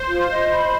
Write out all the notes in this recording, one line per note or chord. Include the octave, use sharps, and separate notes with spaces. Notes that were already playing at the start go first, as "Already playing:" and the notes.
Already playing: C5
F4
C5 D#5
B5